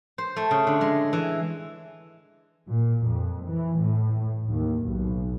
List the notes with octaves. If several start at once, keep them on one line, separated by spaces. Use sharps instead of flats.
C5
A3
C#3
D3
G#3
E3
A#2
F2
E3
A2
D#2
B1